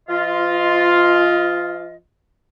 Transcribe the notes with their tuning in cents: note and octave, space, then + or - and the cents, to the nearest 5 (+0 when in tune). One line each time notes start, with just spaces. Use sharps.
F3 -45 F4 +0 D#5 +25